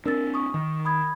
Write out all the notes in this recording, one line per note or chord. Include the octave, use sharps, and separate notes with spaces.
C4 D4 A#4 E6 A6
C#6 D#6
D#3
B5 D#6 G#6